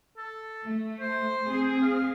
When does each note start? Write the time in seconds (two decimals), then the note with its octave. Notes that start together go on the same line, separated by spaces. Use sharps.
0.17 A4
0.64 A3
1.00 C5
1.47 C4 G#4
1.82 F5